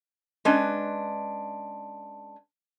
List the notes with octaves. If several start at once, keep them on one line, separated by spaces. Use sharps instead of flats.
G#3 C#4 D4 B4